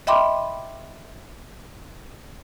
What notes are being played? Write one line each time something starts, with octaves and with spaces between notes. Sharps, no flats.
D#5 E5 G5 B5 C6 D6